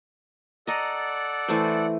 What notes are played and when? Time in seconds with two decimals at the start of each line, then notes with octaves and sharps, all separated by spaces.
0.67 A4 D5 D#5 F#5 A#5
1.48 E3 A3 C5